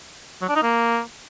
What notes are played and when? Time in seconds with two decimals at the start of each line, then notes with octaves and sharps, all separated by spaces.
0.41 F#3
0.48 D4
0.56 D#4
0.63 A#3